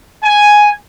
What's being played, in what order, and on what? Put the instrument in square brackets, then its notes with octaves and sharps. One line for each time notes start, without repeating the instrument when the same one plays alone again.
[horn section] G#5